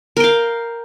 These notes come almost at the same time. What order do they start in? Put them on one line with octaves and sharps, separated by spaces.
A#4 G5 F5